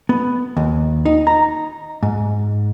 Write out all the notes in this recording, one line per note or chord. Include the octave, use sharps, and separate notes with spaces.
B3
D#2
D#4
A#5
G#2